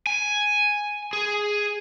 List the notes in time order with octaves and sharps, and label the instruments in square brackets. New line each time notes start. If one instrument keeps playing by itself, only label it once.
[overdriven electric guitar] G#5
G#4